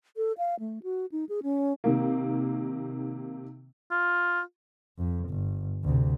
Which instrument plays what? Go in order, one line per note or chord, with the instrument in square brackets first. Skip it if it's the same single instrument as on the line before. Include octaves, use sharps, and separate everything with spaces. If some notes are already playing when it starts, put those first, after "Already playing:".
[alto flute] A4
F5
A3
F#4
D#4
G#4
C#4
[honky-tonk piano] C3 D#3 A#3
[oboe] F4
[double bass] F2
G1
D2 C3